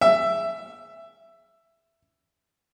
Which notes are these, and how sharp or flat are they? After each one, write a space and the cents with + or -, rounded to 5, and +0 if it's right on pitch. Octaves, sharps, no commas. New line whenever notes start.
E5 +10